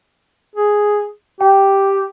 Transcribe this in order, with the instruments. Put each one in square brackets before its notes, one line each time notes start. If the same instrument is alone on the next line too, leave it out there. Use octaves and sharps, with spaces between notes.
[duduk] G#4
[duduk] G4 [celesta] G5